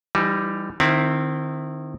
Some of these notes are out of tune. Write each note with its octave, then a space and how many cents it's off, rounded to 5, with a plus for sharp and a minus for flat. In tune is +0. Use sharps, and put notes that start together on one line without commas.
E3 +30 G3 +0 D#4 +0
D#3 -25 C4 +0 E4 +0